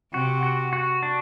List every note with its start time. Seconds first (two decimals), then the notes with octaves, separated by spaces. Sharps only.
0.13 C3 F#4
0.43 F#4
0.73 F#4
1.03 D4